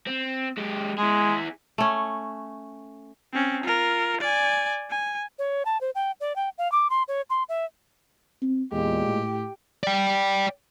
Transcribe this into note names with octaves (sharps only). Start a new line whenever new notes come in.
C4
G#3 G4
G#3 E4 G#4
A3 C#4
C4 C#4
F4 A#4
D5 G#5
G#5
C#5
A5
C5
G5
D5
G5
F5
D6
C6
C#5
C6
E5
C4
E2 A#2 G#3 G4
A2
D5 G5